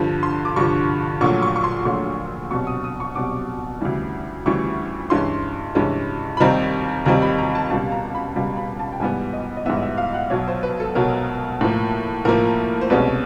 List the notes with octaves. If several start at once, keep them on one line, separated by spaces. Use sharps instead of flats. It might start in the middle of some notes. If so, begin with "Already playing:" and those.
Already playing: G2 D3 F3
C6
D6
G2 D3 F3 C#6
A#1 A#2 F#3 A3 C#6
C#6
C#6
C6
A#1 A#2 F#3 A3 C#6
C2 B2 F#3 C#6
D#6
D#6
C#6
C2 B2 F#3 D6
D2 C#3 E3 G3
D2 C#3 E3 G3 C#6
G2 E3 G#3 C#4 C6
G2 E3 G#3 C#4
B5
D#2 D#3 G3 C4 D#4 A#5
D#2 D#3 G3 C4 D#4 A#5
B5
A#5
A5
C#2 B2 G3 A5
A#5
B5
C#2 B2 G3
B5
A5
G5
G#2 E3 G3 B3 G#5
D#5
D#5
G#2 E3 G3 B3 E5
D#5
E5
F5
F#5
B1 B2 F#3 C#5
C5
B4
A4
B1 B2 F#3 A#4
A2 F3 A#3
A2 F3 A#3 A#4
C5
C2 B2 G#3 C#4 B4